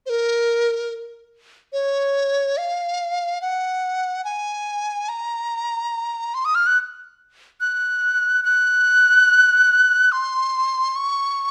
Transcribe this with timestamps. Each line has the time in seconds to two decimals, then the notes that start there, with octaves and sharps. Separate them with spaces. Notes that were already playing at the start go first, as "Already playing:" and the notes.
0.06 C5
0.10 A#4
1.73 C#5
2.57 F5
3.42 F#5
4.25 G#5
5.09 A#5
6.34 C6
6.45 D#6
6.55 F6
6.67 F#6
7.61 F#6
8.45 F#6
10.12 C6
10.96 C#6